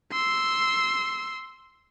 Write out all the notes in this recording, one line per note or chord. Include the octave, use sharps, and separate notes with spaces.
C6 E6